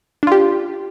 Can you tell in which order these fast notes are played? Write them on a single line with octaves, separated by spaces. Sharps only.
D4 F4 G4